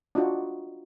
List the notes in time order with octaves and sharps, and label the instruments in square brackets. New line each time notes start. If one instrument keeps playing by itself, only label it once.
[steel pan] D4 D#4 F4 F#4